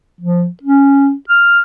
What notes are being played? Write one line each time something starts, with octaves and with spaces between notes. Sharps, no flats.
F3
C#4
F6